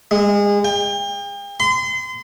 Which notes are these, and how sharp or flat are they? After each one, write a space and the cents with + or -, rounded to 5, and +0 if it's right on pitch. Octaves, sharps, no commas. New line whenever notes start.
G#3 -30
G5 +40
C6 -35